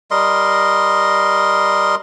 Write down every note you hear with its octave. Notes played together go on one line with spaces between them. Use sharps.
G3 A#4 D#5 C6